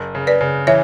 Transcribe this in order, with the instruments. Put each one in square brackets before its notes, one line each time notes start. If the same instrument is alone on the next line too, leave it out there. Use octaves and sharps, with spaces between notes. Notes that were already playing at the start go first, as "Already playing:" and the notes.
Already playing: [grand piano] F#1
C#3
[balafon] B4 D5
[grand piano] C#3
[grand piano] E3 [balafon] C#5 E5